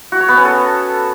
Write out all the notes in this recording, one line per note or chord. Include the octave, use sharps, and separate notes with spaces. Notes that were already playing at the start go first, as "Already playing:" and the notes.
F#4
C#5
B3
C#4
A4